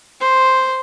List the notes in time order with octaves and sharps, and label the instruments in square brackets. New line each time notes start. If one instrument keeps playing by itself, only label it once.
[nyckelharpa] C5